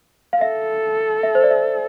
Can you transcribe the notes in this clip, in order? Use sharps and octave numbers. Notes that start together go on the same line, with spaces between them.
F5
A4 E5
E5
C5
D5
E5